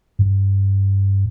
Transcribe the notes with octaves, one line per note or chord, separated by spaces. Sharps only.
G2